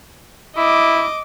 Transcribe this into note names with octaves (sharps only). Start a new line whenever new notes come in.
E4 D#5 D6